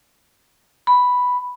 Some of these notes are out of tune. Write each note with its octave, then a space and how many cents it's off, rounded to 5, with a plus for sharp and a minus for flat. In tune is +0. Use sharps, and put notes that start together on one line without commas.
B5 +0